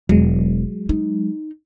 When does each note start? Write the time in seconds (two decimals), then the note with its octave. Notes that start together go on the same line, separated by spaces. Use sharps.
0.09 E1 F#3 G#3
0.89 D#4